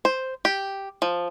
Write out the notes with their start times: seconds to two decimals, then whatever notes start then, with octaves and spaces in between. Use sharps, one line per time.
0.05 C5
0.45 G4
1.02 F3